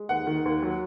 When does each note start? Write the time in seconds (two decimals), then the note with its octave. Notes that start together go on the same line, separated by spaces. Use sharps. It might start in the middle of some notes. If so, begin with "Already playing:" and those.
Already playing: G#3
0.09 D#2 F#5
0.27 D#3
0.45 D#2
0.62 F#3